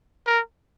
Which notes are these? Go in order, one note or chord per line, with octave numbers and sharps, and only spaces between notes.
A#4